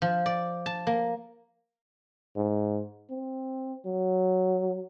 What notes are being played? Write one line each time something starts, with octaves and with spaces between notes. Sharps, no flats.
F3
D5
A5
A#3
G#2
C4
F#3